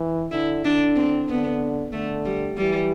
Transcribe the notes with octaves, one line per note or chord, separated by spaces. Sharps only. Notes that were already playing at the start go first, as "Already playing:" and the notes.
Already playing: E3
D3 E4
D3 D4
C4
D3 B3
D3 A3
G3
E3 G3